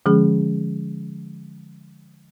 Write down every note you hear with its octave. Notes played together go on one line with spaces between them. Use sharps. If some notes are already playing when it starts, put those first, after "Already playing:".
D3 F3 G#3 C#4 G#4